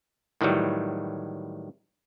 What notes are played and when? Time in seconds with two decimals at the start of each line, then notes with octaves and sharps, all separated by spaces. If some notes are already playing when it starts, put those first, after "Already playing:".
0.41 A2 D#3 E3 F#3 G3